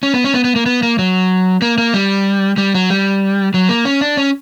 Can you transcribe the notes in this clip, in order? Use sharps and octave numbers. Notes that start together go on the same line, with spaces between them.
C#4
B3
C#4
B3
B3
A#3
B3
A#3
F#3
A#3
A#3
G3
G3
F#3
G3
F#3
A#3
C#4
D4
C#4